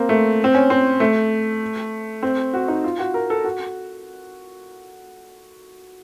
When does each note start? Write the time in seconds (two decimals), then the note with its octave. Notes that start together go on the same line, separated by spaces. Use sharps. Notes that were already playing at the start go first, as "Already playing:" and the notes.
Already playing: A#3 C4
0.09 A3
0.44 C4
0.55 C#4
0.70 C4
1.00 A3
2.23 C4
2.53 F#4
2.68 D#4
2.84 F4
2.99 F#4
3.14 A#4
3.30 A4
3.44 F#4